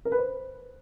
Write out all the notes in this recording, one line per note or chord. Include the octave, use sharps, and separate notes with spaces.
A#4
B4
C5